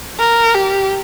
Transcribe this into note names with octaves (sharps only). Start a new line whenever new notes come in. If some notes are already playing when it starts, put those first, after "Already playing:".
A#4
G4